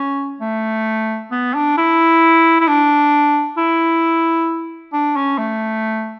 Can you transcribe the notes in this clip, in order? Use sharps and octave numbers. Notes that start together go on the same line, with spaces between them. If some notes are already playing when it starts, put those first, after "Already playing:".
Already playing: C#4
A3
B3
D4
E4
E4
D4
E4
D4
C#4
A3